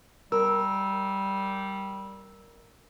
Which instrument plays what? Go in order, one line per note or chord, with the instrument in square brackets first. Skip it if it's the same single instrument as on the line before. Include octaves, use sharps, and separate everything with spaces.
[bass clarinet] G3 [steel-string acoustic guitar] A#4 [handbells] E6